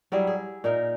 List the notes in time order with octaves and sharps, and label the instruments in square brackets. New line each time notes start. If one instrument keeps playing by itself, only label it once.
[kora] F#3 G3 E4 G#4
G#4
A#2 D#4 A#4